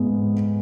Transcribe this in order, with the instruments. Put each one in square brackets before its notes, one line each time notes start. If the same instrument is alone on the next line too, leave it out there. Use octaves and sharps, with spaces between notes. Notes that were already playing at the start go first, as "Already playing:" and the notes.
Already playing: [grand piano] G#2 G#3 B3